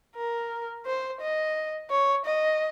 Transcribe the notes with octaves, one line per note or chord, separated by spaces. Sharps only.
A#4
C5
D#5
C#5
D#5